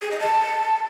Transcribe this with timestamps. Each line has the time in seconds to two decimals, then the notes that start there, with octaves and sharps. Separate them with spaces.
0.02 G#4
0.11 D#5
0.20 A5